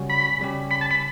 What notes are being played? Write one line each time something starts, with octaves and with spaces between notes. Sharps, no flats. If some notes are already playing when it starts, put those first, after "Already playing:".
Already playing: C#3 G3 C#4 F#4
B5
C#3 G3 C#4 G4
B5
A5
B5